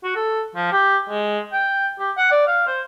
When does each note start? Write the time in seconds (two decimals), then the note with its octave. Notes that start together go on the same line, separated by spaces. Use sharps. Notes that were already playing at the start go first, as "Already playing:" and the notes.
0.04 F#4
0.16 A4
0.55 F3
0.72 G4
1.09 G#3
1.53 G5
1.99 G4
2.17 F#5
2.31 D5
2.47 F5
2.67 C5